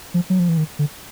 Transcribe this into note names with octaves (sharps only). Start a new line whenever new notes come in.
F3
F#3
F3
E3
D#3
D3